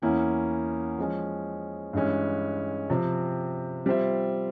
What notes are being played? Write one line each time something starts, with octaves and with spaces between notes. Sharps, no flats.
E2 E3 A#3 C#4 E4
F3 G#3 C#4
G2 E3 G#3 C#4 E4
C3 F3 C4
G3 C4 F4 C5 E5